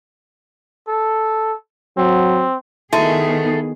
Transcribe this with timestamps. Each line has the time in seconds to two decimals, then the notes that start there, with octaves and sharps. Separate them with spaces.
0.88 A4
1.97 F#3 C4
2.93 D#3 A3 B3 E4 F#4 G#4 A5